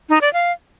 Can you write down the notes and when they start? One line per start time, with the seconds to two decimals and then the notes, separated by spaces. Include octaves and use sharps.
0.09 D#4
0.21 D5
0.33 F5